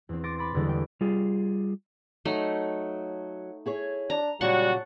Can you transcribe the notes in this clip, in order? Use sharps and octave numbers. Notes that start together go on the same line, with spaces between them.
E2 C4
C6 D6 A6 A#6 D7
B5 D6 A6 A#6
E2 D3 G3 G#3
G5
G3 F4 G#4
F#3 A3 D#4
E4 G#4 C#5
D4 A#5
A#2 C#3 F#3 G3 F#4 F#5 A5 C#6